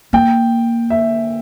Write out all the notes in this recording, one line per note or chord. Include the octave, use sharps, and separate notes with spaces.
A#3 G5
E5